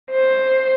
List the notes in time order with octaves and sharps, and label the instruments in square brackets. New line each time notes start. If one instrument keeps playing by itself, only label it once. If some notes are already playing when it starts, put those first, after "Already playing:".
[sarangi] C5